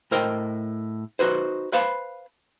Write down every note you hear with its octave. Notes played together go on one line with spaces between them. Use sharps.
A2 A#4 C5 D#5 G5
D#4 F#4 B4 C5
B4 C5 F5 A5 B5